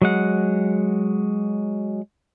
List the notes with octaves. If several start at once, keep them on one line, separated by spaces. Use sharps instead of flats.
F#3 G#3 F#5